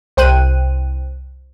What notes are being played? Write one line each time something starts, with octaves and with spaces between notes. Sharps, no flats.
C2 C5 G5 F#6 D#7